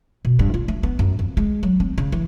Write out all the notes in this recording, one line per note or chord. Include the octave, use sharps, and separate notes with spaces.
B2
G2
F4
A3
B3
F#2
F2
G#3
F#3
C4
C#3
E3